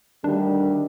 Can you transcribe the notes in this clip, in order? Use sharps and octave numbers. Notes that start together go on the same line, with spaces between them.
D2 D#3 G3 D4